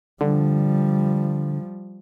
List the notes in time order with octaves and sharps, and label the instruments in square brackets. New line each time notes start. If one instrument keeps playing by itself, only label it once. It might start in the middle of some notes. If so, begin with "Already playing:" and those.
[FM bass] D3 [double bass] F3 G3